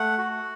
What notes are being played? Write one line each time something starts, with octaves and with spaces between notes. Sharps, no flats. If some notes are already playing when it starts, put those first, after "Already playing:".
Already playing: A3 F#5
F#4